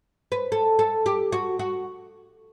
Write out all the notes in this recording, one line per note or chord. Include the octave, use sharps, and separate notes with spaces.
B4
A4
A4
G4
F#4
F#4